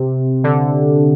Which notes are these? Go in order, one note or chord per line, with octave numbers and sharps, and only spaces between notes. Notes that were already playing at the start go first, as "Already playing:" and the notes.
Already playing: C3
D3